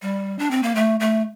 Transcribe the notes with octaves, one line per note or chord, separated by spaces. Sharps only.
G3
D4
C4
A#3
A3
A3